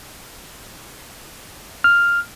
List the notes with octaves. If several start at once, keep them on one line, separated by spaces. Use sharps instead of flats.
F6